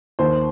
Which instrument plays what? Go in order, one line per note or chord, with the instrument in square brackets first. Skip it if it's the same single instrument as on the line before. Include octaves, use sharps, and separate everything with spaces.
[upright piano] D#2 C5